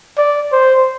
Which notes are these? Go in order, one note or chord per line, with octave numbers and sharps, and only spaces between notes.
D5
C5